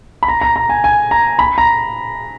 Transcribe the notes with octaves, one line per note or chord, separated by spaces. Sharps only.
B5
A#5
A#5
A#5
G#5
G#5
A#5
B5
A#5